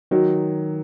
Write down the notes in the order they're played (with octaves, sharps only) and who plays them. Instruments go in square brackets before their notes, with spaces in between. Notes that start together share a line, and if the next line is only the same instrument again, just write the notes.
[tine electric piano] D#3 [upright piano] F#3